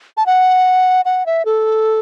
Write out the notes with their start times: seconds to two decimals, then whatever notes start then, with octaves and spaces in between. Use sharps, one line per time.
0.17 A5
0.26 F#5
1.05 F#5
1.26 E5
1.45 A4